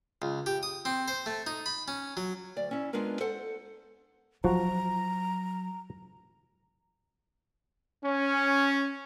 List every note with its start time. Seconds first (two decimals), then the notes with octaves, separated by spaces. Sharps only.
0.22 C#2
0.46 G4
0.63 D#6
0.85 C4
1.08 C5
1.26 A3
1.47 D#4
1.66 B5
1.88 C#4
2.17 F#3
2.56 D2 D5
2.71 C#4 E4
2.93 G#3 B3 D4 F4 A#4
3.20 A4 C5 F#5
4.44 F3 F#3 F#4 A#5
8.03 C#4